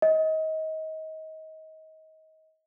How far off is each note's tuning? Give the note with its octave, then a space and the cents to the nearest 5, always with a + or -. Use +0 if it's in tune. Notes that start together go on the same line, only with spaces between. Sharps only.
D#5 +25